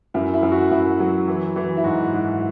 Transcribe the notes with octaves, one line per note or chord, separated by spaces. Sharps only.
F#2 E4
E4
F#2
F#4
F#2 E4
F#3
E3
E3
E4
G#2 F#4
G#2